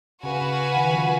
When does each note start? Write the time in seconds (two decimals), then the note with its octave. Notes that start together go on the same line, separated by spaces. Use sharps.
0.23 C#3 F#4 B4 F5 G#5
0.41 C#3
0.76 D#3
0.94 F3